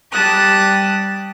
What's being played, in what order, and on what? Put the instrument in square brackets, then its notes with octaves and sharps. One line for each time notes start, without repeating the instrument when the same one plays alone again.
[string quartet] G3 G4 A5 D#6 F#6